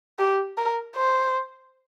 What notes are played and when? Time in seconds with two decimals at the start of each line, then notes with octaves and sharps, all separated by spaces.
0.19 G4
0.58 A#4
0.96 C5